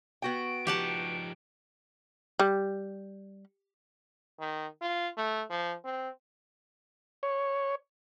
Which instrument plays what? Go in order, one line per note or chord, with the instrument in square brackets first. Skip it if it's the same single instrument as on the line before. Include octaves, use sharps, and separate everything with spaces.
[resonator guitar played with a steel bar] B3 F#4 G5 [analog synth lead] D7
[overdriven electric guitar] F3 D#4 [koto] G4 F#5 A5
[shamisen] G3
[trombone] D#3
F4
A3
F3
C4
[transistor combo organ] C#5